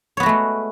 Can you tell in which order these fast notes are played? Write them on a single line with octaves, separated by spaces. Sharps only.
C#5 B3 F#4 A3 G#3